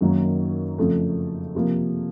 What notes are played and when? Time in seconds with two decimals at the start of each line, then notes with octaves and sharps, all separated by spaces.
0.01 F#2 D#3 F#3 A#3 D#4
0.78 F2 C#3 F3 A3 C4
1.55 C3 F3 A#3